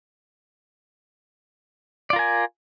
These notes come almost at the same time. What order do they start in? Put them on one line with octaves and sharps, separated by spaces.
D5 F4 A#4 G#5